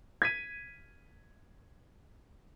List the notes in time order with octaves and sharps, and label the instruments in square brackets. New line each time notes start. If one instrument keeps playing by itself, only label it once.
[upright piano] G#6 B6 D#7